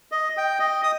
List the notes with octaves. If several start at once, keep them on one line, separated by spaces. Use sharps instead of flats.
D#5
G5
D#5
D#6